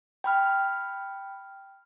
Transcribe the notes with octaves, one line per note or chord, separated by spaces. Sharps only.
G5 B5 F6